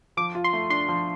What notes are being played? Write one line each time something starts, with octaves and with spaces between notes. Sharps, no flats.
F3 D6
F4
C6
A3
D4 C6
F3